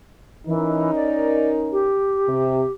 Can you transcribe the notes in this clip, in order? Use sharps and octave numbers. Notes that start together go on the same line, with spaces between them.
E3 C#4 D#4 A#4
D5
G4
C3